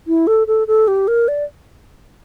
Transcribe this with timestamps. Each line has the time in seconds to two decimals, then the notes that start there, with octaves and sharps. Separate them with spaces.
0.07 E4
0.27 A4
0.47 A4
0.68 A4
0.88 G4
1.08 A#4
1.28 D5